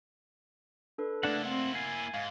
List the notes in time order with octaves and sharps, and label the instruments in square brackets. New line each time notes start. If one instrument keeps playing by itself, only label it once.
[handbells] D4 A4 B4
[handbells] A3 D5 [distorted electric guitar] A#3 E4 [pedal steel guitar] D4 F#5
[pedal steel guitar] C4 [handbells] F#5
[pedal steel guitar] G#5 [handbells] A6 C7
[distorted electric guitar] G#2 [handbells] F5